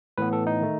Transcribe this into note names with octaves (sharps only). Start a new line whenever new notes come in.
A2 E3 B3 B4
A4
D#4
D#3 A3